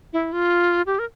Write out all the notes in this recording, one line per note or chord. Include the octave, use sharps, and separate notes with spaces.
E4
F4
G4
A#4